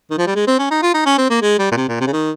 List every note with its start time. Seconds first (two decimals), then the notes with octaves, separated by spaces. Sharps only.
0.11 D#3
0.18 F3
0.27 G3
0.35 G#3
0.47 C4
0.59 C#4
0.71 D#4
0.82 F4
0.94 D#4
1.06 C#4
1.18 C4
1.30 A#3
1.42 G#3
1.59 G3
1.72 A#2
1.77 C3
1.88 A#2
2.01 C3
2.07 C#3
2.13 D#3